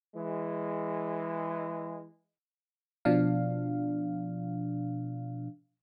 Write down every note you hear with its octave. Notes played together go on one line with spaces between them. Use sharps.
E3 G#3
B2 F3 D4 F5